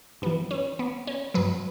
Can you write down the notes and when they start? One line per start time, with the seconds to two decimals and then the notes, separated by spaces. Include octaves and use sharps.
0.22 G2 E3 B3
0.51 C#4
0.79 B3
1.07 C#4
1.34 G2 F#3 B4